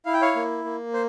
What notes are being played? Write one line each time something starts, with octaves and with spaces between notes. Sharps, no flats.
E4 F5
G5
C#5 F5
A#3
A#3
C5